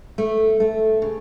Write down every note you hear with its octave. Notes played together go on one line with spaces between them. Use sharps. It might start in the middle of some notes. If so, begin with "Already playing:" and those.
A3
A3
C#3